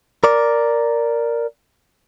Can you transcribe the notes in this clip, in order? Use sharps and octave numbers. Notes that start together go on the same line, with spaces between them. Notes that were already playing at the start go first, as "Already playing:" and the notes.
A#4 D5